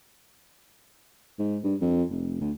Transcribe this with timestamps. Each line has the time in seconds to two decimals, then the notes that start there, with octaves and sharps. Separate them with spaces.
1.39 G#2
1.64 G2
1.81 F2
2.10 F1
2.41 D2